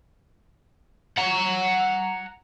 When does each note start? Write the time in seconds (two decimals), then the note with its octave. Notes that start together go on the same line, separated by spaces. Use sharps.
1.17 F#5 A#5